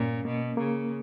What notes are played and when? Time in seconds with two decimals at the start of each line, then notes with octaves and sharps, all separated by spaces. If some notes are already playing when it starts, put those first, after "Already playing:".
Already playing: G2 A#2 C#4
0.25 B2 A#3
0.57 C#3 A#3